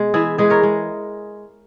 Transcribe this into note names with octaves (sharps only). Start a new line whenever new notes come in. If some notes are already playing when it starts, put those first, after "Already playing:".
Already playing: B2 G#3
E3 E4 G#4
G#3 G#4 B4
A#4 C#5
G#3